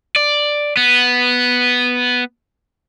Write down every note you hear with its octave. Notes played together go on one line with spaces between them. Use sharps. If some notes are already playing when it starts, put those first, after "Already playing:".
D5
B3